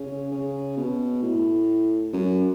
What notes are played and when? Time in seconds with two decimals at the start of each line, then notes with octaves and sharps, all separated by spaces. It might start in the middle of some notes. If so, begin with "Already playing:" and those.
Already playing: C#3
0.32 C#3
0.77 B2
1.22 A2
2.13 F#2